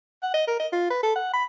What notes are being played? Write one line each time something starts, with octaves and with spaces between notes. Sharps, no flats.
F#5
D#5
A#4
D#5
F4
B4
A4
F#5
B5